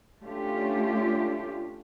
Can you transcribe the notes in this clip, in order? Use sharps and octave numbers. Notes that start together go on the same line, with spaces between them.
A3 C#4 D4 F4 G4